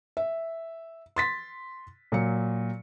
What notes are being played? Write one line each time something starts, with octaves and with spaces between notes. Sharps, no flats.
E5
C6 A6 B6
A#2 F#3 C#7